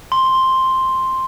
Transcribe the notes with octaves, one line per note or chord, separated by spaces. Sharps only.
C6